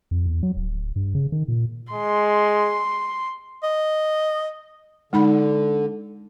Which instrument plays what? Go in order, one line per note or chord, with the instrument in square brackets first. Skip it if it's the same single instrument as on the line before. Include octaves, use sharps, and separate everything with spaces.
[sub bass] F2
E2
F#3
D1
G2
C#3
D#3
A#2
[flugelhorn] G#3 [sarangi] C6
[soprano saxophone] D#5
[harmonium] D3 [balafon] G#3 D#4 B5